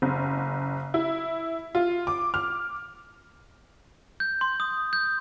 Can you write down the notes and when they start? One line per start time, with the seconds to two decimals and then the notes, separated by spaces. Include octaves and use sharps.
0.02 F#1
0.94 E4
1.75 F4
2.07 D6
2.34 F6
4.20 G6
4.41 C6
4.60 D#6
4.93 G6